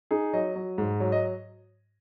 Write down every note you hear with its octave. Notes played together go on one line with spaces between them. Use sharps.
D#4 G#4
F#3 D#5
F#3
G#2
F#3
D#5